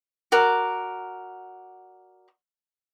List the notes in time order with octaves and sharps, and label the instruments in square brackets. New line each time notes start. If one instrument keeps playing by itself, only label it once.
[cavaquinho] F#4 A#4 D5